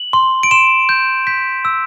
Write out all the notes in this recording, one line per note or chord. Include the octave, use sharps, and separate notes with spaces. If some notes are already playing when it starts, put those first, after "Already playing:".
Already playing: F#7
C6
D7
C6 E7
G6
G6 B6
E6